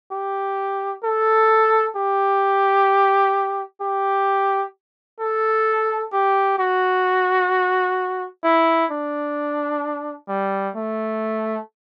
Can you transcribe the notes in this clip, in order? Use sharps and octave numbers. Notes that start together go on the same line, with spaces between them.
G4
A4
G4
G4
A4
G4
F#4
E4
D4
G3
A3